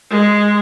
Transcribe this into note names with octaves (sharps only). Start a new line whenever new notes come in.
G#3